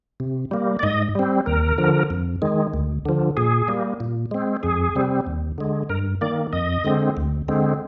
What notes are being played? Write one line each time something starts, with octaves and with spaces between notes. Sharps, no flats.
C3
G3 A#3
D5
G#2 D#5
G3 C4
D#2 A#4
D3 F3
F2
D#3 G#3
D2
D3 F3
A#2 G#4
G3 A#3
A#2
G#3 C4
F2 G#4
C3 G3 C4
D#2
D3 G#3
G2 A#4
D#3 A#3 D5
F2 D#5
D3 G#3 C4
D2
D3 G#3 C4